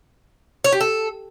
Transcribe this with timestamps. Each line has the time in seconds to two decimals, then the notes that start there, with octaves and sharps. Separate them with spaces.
0.64 C#5
0.72 G4
0.80 A4